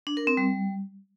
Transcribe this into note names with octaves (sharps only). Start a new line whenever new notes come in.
D4
A#4
C4
G3